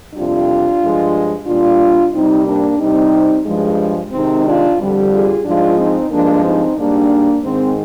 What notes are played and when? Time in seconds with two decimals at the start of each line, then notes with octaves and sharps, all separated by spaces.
0.15 F2 C3 G3 D4 F4
0.81 G2 F3 G#3
1.47 A#2 G3 D4 F4
2.13 C3 G3 C4 D#4
2.46 A#3 D4
2.80 C3 G3 C4 D#4
3.46 G2 F3 G#3
4.12 C3 D#3 G#3 C4 D#4
4.45 D4 F4
4.78 F2 D3 G3
5.11 F4 G#4
5.44 G#2 F3 G#3 D4 F4
5.77 C4 D#4
6.11 G2 F3 G#3 A#3 D4
6.44 C4 D#4
6.77 G#2 G3 A#3 D4
7.43 G#2 D#3 G#3 C4